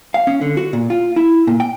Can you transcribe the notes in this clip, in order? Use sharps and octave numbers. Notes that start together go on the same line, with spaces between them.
F5
C#4
D3
F#4
A#2
F4
E4
A#2
G5